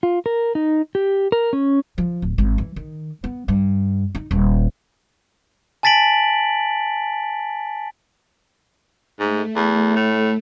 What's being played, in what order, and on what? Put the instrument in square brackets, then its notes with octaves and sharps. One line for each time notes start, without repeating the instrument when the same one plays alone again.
[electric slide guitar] F4
A#4
D#4
G4
A#4
C#4
[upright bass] F3
D1
G#1
E3
D#3
B3
G2
D#4
D#1
[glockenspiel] G#5 A5 A6 B6 D7 F#7
[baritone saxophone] G#2 [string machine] A3
[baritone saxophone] E2
A2